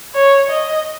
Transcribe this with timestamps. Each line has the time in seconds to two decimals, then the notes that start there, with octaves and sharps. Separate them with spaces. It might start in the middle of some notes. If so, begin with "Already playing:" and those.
0.14 C#5
0.49 D#5